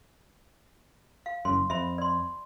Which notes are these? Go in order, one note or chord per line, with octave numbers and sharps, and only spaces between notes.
F5
F#1 F#2 C6
F2 E5 B5
D5 C6